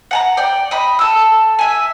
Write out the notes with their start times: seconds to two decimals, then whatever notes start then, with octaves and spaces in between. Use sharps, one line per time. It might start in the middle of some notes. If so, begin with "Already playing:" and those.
0.11 F#5 A5 A#5
0.37 D5 G5
0.71 D#5 B5
0.99 A4 E6
1.59 E5 G#5